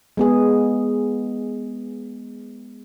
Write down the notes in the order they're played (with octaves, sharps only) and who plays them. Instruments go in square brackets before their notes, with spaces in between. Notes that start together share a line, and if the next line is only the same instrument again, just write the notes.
[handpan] G#3 B3 G#4